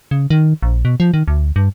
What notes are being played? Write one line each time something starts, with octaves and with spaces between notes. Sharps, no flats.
C#3
D#3
A#1
B2
F3
D#3
D2
G2